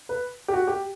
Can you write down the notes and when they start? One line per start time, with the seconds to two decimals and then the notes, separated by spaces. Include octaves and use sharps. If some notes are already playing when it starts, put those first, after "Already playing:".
0.09 B4
0.48 G4
0.53 F#4
0.67 G4